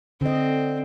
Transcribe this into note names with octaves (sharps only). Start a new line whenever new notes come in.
D3 C4 D#5